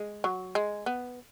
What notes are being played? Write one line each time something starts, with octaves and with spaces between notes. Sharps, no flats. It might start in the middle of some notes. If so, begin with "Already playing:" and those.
Already playing: G#3
F#3
G#3
B3